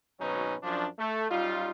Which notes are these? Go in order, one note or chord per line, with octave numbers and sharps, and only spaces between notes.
G#1 B2 F#3 C#4 D#4 B4
F#2 F3 D4
A3
F#2 G3 D#4 F4